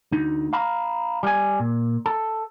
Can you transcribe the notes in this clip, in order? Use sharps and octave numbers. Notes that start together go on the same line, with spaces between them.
D2 D#4
F5 A#5 B5
G3 G#5
A#2
A4